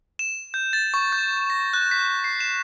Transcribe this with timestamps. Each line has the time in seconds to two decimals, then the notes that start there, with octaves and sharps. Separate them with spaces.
0.19 E7
0.54 G6
0.73 A6
0.94 C#6
1.12 G6
1.50 A#6
1.73 F#6
1.91 B6
2.24 C7
2.40 E7